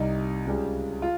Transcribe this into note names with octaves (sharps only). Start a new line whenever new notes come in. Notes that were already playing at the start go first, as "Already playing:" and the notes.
Already playing: C2 C3 G3 D#4
C#2 C#3 G3
F4